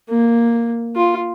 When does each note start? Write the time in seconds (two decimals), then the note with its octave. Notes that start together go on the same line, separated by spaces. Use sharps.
0.09 A#3
0.95 F4